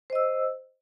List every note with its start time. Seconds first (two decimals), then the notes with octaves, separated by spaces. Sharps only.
0.10 C5
0.13 D#5
0.15 E6